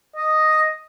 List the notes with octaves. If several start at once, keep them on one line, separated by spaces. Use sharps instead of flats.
D#5